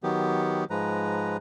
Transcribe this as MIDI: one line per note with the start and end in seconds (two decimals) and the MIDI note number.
0.03 0.64 51
0.03 0.64 54
0.03 0.64 59
0.03 0.64 67
0.70 1.37 44
0.70 1.37 53
0.70 1.37 56
0.70 1.37 71
0.70 1.37 82